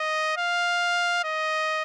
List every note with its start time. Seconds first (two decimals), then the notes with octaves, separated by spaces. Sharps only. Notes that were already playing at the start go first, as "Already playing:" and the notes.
Already playing: D#5
0.37 F5
1.25 D#5